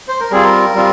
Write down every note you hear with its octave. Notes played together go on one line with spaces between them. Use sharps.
C5
A#4
G3 C4 F4 G#4
A#4
G3 C4 F4